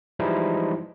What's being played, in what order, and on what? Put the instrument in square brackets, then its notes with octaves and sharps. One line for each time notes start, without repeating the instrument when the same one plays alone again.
[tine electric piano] E3 F3 G3 G#3 D#4 E4